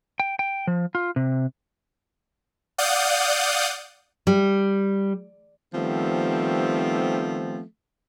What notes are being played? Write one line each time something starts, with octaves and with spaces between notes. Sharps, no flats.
G5
G5
F3
F4
C3
D5 F5 F#5 D#6 G6
G3
D#3 F3 G3 A3 B3 C4